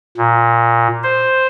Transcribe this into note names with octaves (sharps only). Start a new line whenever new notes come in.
A#2
C5